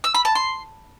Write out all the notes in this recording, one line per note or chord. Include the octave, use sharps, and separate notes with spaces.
E6
B5
A5
C6